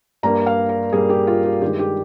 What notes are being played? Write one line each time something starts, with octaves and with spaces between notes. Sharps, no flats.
G2 G3 A#3 A#5
F5
A#4
G2 G3 A#3 G#4
G4
F4
G4
G2 D#3 G#3 G4
G4